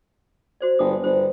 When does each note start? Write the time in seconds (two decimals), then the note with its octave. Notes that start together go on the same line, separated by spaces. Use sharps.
0.61 F#4 C5 D5
0.79 G1 D#6
1.04 G1 C5